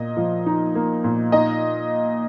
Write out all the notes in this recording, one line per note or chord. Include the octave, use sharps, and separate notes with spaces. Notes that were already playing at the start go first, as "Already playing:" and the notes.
Already playing: A#2 A#3 D#5
F3
D#4
A#3
A#2
D#4 D#5